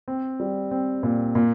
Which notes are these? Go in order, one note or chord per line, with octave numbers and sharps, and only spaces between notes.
C4
G3
C4
A#2
A#2